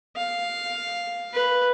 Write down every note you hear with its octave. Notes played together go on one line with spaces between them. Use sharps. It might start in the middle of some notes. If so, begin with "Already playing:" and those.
F5
B4